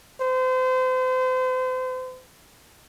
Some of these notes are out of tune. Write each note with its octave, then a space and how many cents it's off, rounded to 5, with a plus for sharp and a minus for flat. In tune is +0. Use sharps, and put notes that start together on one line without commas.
C5 -35